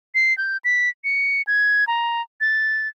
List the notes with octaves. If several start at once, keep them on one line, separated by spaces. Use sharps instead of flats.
C7
G6
B6
C#7
G#6
A#5
A6